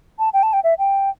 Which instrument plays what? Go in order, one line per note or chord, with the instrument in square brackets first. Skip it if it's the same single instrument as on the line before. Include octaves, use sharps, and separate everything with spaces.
[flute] A5
G5
A5
G5
E5
G5